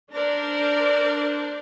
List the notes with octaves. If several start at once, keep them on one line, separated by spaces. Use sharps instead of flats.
D4 A#4 C5 D5